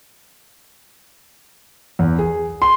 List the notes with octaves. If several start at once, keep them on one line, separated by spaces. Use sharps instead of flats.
E2
G#4
C6